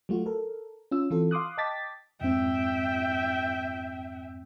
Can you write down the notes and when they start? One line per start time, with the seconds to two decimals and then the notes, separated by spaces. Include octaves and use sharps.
0.09 F#3 A3 F4 F#4
0.26 A4 A#4
0.92 C#4 F4 E6
1.10 E3 C4 F4 A4
1.31 F5 C6 D6 D#6 F#6
1.58 D#5 G5 A5 D6 A6 B6
2.21 F2 G#2 C4 E5 G5